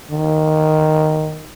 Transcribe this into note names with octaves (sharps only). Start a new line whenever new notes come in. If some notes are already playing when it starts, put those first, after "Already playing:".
D#3